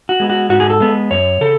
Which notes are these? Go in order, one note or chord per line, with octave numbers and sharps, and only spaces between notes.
F#4
G#3 B3
F#4
G#2 F#4
G#4
A4
G#3 B3
F#2 C#5
C#3 A4